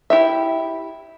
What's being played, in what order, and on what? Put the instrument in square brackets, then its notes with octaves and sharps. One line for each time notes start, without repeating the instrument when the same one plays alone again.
[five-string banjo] E4 G4 E5